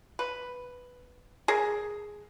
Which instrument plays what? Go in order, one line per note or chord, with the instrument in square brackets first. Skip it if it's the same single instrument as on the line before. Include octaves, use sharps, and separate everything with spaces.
[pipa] B4
G#4 A#4